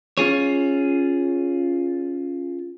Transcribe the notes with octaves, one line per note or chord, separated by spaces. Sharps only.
C#4 F4 G#4 C#5